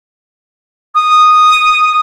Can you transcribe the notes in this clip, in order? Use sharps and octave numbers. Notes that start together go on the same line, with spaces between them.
D#6